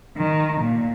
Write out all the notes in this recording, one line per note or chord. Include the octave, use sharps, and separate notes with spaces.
D#3
A#2